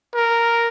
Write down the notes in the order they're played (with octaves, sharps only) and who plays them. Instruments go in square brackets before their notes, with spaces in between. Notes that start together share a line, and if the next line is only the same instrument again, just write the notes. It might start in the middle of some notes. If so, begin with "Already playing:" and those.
[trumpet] A#4